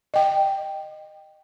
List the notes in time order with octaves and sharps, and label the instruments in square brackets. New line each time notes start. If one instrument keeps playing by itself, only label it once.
[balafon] D#5 G5